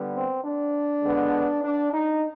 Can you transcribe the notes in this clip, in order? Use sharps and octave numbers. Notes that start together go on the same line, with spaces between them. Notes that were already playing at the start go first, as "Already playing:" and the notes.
Already playing: D3 G3 B3
C4
D4
D3 G#3 B3
D4
D#4